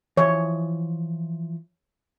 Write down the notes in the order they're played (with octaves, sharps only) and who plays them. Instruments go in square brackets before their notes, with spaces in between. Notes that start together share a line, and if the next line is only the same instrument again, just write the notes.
[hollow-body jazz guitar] E3 F3 D#5 [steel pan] C#5